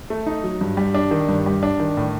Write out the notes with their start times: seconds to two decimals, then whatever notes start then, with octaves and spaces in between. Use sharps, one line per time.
0.10 A3
0.26 D#4
0.43 F#3
0.61 G2
0.77 G3
0.95 D4
1.11 D#3
1.29 G2
1.46 G3
1.63 D4
1.80 D#3
1.97 A2